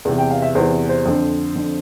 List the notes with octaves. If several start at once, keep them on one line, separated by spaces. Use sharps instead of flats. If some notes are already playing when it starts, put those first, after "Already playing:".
E2 C3 E3
G5
F5
E5
E2 C3 E3 C5
C5
F2 D3
F2 D3